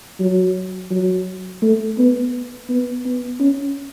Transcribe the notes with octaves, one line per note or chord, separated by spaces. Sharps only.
F#3
F#3
A3
B3
B3
B3
C#4